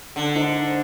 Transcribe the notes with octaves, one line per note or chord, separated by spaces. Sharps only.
D3
D#4 C5